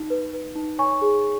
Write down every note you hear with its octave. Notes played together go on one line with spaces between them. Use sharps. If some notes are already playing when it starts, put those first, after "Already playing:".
Already playing: D#4
B4
B4
D#4
C#5 G#5 C#6
G#4